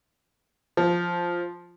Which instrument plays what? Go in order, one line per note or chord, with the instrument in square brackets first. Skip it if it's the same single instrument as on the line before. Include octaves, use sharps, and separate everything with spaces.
[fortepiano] F3